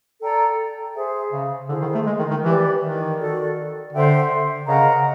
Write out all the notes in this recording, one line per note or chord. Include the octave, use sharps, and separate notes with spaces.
A4 D5 G5 A#5
G#4 C5 E5
C#3
D3 E4 G#4 C5
D#3
A3
G#3
D#3
D#3
E3 G4 B4 D5
D#3
F#4 A4 D5
D3 C5 E5 G5
C#3 A#4 D#5 F#5 A#5